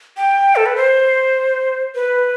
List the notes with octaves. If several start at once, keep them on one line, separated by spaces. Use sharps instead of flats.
G5
A4
B4
C5
B4